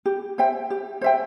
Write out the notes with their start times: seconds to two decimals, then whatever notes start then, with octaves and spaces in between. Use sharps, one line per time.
0.06 G4
0.38 C5 E5 G5
0.70 G4
1.01 C5 E5 G5